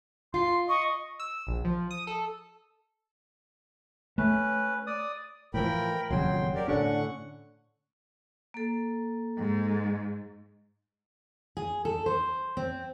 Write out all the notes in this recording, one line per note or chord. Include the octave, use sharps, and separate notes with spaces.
F4 C6
D#5 C#6
E6
A#1
F3
D#6
A4
A3 C#4 B4
D5 D#6
A2 E3 F3 A#4 G5 B5
D#1 F2 C#3 F#3 G5 C6
G4 A#4 D5
A2 D3 C#4 F#5 C#6
A#3 A4
G#2
G#4
A4
C5
C4